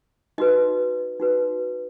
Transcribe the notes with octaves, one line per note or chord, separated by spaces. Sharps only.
D#4 F#4 B4 D#5
D#4 F#4 B4